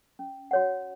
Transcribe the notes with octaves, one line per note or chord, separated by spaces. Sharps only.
C#4
F#4 C#5 F#5